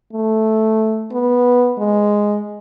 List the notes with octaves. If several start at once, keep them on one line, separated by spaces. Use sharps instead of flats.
A3
B3
G#3